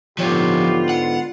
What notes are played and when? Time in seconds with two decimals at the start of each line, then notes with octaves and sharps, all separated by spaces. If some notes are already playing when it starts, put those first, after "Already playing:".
0.18 G#2 D3 F3 B3 F4 G4 C#5
0.89 F#5